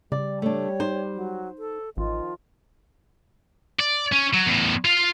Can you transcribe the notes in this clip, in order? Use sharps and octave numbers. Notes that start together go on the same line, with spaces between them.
C#3 G3 D5
A3 D4 C#5
D#4 C5
F#3
A4
A1 D#3 F3 F4 D#5
D5
C#4
F#3
E2 A2
F4 F5